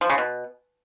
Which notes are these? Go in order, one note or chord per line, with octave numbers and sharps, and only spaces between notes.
F3
C#3
B2